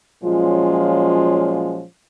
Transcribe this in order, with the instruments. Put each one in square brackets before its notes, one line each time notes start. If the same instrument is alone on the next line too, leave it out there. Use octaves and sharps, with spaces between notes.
[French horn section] A#2 F3 F#3 G#3 C#4 F4